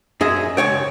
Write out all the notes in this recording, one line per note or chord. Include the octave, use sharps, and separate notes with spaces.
F#2 G#4 D#5 E5
C#2 G2 C#5 G5